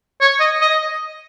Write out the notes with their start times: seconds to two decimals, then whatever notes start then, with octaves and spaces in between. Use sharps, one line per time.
0.21 C#5
0.40 D#5
0.61 D#5